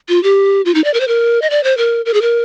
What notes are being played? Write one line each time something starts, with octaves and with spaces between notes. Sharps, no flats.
F4
G4
F4
D#4
D5
A#4
C5
A#4
D#5
D5
C5
A#4
A#4
G#4
A#4